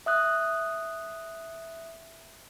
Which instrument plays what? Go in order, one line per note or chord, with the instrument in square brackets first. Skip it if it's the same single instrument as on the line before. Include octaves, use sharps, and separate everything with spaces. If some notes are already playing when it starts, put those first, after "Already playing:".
[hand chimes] E5 D#6 F#6